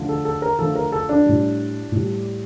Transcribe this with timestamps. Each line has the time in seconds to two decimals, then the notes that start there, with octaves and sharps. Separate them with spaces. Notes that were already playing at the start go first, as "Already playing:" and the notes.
Already playing: D3 F3 A3
0.09 A4
0.25 A4
0.42 A#4
0.59 D3 F3 A3 A4
0.75 A#4
0.92 A4
1.09 D4
1.26 A2 G3
1.92 A2 G3